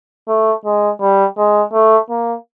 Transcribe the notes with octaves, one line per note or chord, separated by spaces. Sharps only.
A3
G#3
G3
G#3
A3
A#3